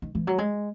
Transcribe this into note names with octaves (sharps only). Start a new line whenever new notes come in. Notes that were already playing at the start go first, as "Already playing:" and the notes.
D#3
E3
F#3
G#3